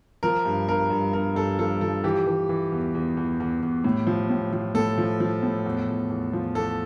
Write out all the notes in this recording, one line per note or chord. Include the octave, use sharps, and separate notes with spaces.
F3 A#4
G2
G2 A#4
G2
G2 A#4
G2 A4
F3 A4
F3 A4
E3 G4
E3
E3
E2
E2
E2
E2
E2
A2
F3
A2
F3
A2 A4
F3
F3
A2
E2
E2
E2
F3
E2 A4